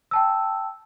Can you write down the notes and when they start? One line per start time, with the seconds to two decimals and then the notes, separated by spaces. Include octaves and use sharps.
0.11 G5 A5 E6